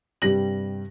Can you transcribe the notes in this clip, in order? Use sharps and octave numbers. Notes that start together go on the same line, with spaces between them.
G2 C3 G3 A#6 F#7